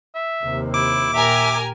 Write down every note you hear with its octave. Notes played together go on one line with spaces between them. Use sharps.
E5
D#2 C3
E4 D6
A#2 G4 A#4 E5 G#5